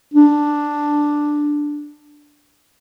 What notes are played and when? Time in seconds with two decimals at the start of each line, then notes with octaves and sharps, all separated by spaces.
0.14 D4